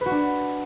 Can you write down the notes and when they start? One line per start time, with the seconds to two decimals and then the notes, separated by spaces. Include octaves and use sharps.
0.01 B4
0.06 F#4
0.11 D4